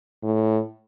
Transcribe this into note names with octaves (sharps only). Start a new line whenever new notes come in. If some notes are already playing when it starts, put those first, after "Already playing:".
A2